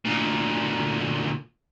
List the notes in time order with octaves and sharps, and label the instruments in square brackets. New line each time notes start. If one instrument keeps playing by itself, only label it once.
[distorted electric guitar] D2 A#2